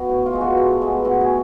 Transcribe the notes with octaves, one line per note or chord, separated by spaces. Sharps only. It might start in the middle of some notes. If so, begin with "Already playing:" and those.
Already playing: B3 F#4
A2
F4
G#3 B3
F#4
A2
G#3 B3
A2 F#4
G#4